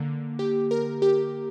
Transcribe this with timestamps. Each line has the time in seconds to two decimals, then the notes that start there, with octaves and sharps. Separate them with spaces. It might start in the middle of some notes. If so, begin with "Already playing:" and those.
Already playing: D3 A#3
0.39 G4
0.71 A#4
1.02 G4